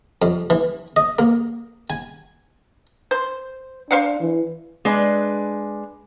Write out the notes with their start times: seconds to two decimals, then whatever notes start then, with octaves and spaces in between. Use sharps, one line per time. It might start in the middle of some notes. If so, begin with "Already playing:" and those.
0.22 F2
0.50 E3
0.96 D#5
1.19 A#3
1.90 G#5
3.11 C5
3.91 D4 C5 F5 F#5
4.20 E3
4.85 G#3 D4 B4